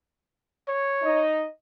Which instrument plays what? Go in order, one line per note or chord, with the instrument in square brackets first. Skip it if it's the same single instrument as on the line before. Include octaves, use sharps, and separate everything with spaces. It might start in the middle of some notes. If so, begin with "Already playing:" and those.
[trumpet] C#5
[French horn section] D#4 D#5